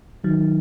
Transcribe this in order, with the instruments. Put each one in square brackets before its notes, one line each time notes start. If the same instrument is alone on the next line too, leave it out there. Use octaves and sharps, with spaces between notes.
[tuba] D#3 [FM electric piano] F#3